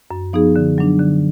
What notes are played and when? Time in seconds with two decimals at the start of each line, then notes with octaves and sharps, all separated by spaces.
0.11 F#2
0.33 F3 B3 D#4 G#4
0.56 D3
0.78 F#3 D4
0.99 D3